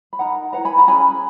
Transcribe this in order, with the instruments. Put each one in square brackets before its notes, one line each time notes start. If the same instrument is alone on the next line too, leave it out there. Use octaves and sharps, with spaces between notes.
[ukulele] B5
D#4 A#4 F#5 A#5
E4 B4 F#5 A#5
G#5 B5
A#5
C#4 G#4 B4 G#5 B5